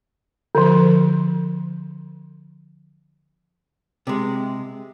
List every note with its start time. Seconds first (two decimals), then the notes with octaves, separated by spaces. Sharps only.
0.55 D3 F3
4.07 C3 G#3